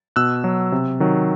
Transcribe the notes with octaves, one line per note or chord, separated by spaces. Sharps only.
B2 E6 F#6
F#3
C3
D#3 F#3